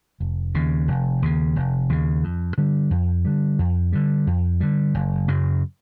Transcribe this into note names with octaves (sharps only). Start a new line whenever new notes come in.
F1
D#2 C#3
F1
D#2 C#3
F1
D#2 C#3
F2
D3 G3
F2
D3 G3
F2
D3 G3
F2
D3 G3
F#1
F#2 C#3 F#3